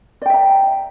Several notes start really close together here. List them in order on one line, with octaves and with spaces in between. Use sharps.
D5 G5 E5 A#5